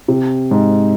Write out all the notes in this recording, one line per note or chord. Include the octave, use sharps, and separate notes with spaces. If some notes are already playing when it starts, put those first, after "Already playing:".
C3
G#2